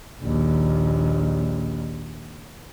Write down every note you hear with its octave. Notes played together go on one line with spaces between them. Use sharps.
A#1 D#2